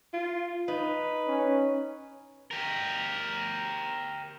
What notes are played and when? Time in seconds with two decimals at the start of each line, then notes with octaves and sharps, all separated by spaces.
0.13 F4
0.68 D#4 B4
1.27 C#4
2.51 G4 A#4